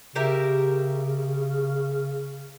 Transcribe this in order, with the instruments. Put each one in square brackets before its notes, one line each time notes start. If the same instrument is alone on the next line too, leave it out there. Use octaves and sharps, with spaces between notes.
[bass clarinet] C#3 [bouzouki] G4 A#4 E5